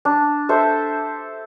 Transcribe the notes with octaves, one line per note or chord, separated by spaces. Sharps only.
D4
A4 C5 E5